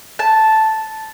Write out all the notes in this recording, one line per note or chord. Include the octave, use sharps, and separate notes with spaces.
A5